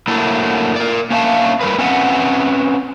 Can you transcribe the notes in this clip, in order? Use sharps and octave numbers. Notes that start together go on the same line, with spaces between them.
F#3 A3 A#3 D4 E4
A#4 D5
A#3 C#4 D4 E5 F5 A5
G3 G#3 A#4 B4
C4 C#4 B4 E5 F#5 G#5